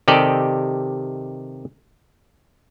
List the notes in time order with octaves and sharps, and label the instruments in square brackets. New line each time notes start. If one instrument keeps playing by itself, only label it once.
[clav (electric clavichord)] C3 D#3 G4 A4 D5 D#5